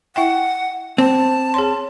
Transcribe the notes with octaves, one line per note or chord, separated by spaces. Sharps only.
E4 E5 F#5 G5
C4 A5
G#4 C#5 C6